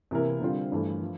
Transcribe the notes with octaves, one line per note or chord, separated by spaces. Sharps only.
C3 E3 A#3 E4 A#4
D3 G3 C4 F4
G2 E3 A3
F3